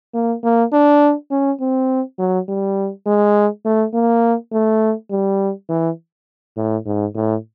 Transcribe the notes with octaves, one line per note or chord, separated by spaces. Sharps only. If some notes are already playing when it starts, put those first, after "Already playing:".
A#3
A#3
D4
C#4
C4
F#3
G3
G#3
A3
A#3
A3
G3
E3
A2
G#2
A2